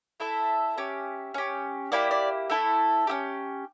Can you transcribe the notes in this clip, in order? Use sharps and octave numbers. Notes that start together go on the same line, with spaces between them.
A3 E4 A4 E5
C#4 G4
C#4 G4
A#3 E4 G4 D5
D5
A3 E4 A4
C#4 E4 G4